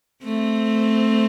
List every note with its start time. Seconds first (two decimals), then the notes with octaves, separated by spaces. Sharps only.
0.24 A3 C4